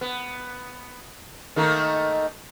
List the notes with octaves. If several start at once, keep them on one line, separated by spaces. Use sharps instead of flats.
B3
D#3 A3 A#3